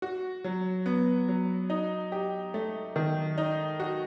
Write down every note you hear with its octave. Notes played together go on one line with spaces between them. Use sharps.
F#4
F#3
B3
F#3
D#4
G4
A3
D#3
D#4
F#4